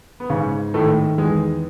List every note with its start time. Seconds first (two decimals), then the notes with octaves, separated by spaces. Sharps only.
0.20 B3
0.30 G#2 C#3 C#4
0.74 A2 D#3 A3
1.18 E2 G#3